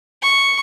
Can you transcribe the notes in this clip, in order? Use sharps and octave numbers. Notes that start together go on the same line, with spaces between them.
C#6